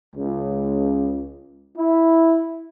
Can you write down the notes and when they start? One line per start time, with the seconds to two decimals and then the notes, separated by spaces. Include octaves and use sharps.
0.15 C#2
1.76 E4